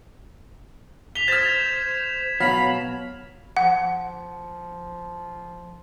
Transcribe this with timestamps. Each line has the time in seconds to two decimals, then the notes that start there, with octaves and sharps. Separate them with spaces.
1.15 B6 F7 G7
1.28 C5 F6 G#6 A6 E7
2.40 B2 F#3 F5 B5
3.57 F3 F#5